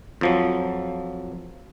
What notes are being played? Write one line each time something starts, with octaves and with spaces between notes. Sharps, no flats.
F2 F3 F#3